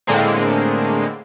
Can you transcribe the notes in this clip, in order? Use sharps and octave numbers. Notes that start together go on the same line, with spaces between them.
A2 D3 G#3 A#3 C4